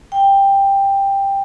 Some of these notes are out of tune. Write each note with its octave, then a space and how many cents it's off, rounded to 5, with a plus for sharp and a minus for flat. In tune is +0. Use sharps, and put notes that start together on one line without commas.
G5 +10